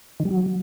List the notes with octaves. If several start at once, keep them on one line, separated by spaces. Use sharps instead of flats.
D#3
G3
F#3